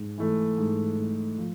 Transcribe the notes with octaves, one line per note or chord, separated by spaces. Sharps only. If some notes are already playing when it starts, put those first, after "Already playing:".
Already playing: G#2
E3 A3
G#2
E3 A3
F3